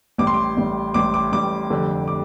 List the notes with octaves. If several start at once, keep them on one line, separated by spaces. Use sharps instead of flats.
A1 A2 G3 D6
C6
D6
A1 A2 G3
A1 A2 G3 D6
D6
A1 A2 G3 D6
F1 F2 D3 G3 C4
D6